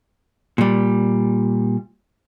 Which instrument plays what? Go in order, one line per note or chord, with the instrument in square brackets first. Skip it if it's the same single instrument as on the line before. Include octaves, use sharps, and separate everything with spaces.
[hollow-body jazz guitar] A#2 G3